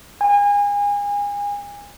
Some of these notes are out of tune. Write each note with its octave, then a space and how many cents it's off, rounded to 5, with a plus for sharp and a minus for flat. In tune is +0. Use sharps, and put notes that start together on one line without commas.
G#5 -30